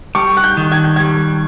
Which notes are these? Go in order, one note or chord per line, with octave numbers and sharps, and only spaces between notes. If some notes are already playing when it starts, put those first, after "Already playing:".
G3 C#6
F#6
G6
D#3
G#6
G6
G3 G#6